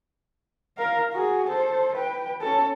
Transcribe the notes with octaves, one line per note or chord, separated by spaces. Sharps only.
A#4 F5
F#4 G#4
A4 C5
B4 G5
C#4 A4